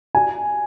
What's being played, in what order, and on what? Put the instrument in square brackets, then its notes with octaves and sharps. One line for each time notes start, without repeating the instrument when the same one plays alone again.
[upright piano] G#5